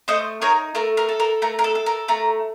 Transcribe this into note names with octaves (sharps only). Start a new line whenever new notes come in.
A3 C5 D#5
D#4 A#4 C#5
A3 A#4
A#4
A4
A#4
A3 A#4
A#4
A4
A4
A#4
A3 A#4